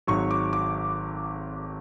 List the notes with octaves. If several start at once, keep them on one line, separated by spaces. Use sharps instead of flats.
G#1 G#2 F#3 C#6
D6
D6